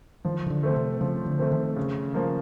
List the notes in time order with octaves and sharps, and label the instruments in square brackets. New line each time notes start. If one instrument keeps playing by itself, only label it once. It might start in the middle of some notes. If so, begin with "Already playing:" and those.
[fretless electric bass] D#3 [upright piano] F3
[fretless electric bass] D#3
D3
[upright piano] A3 C4
[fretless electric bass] C3
[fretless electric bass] C#3 [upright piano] F3
[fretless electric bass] D3
[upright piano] A3 C4
[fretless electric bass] D#3
[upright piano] C#3
F3 A#3